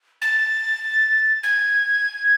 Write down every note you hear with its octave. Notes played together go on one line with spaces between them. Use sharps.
A6
G#6